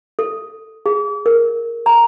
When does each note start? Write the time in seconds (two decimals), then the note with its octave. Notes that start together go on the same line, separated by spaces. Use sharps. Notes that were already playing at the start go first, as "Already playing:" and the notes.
0.19 A4
0.86 G#4
1.26 A#4
1.86 A#5